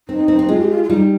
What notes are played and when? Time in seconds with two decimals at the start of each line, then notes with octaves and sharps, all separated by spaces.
0.08 C4 D#4
0.28 C4
0.39 C4
0.49 G#3 F4
0.60 G4
0.70 F4
0.83 F4
0.90 G3 D#4